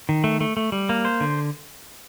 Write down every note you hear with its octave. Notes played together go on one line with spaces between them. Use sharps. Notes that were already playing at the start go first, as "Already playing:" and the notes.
D#3
A3
A3
A3
G3
A#3
C5
D3